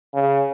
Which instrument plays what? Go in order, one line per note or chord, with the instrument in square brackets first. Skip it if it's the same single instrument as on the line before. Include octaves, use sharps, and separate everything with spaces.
[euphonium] C#3